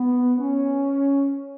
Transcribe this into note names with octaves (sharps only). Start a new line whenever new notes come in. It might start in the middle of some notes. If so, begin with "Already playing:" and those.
Already playing: B3
C#4